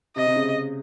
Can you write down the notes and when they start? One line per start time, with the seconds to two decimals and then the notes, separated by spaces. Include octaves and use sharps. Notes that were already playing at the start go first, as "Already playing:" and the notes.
0.16 C3 D#5
0.27 C3
0.36 C#3